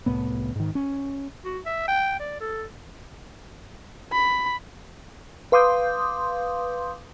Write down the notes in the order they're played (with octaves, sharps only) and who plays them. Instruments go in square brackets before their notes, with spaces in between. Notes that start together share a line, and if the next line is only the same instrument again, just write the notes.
[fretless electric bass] C2 A2 B3
G#2 D#3
C#4
[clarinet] F#4
E5
G5
D5
A4
[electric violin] B5
[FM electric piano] B4 F5 C6 D6 D#6 G6